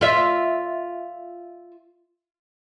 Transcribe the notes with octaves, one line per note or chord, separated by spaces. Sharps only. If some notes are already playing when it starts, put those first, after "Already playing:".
F4 E5